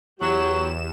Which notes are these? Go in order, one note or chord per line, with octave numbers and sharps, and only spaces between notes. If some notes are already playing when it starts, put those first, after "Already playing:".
E2 F#3 G4 C#6 E7